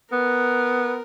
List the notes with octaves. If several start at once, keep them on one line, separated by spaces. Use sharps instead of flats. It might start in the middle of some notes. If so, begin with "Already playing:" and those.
B3 A#4